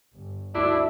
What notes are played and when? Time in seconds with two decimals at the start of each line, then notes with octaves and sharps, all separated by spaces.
0.13 G1
0.55 G1 D2 A3 D4 E4 F#4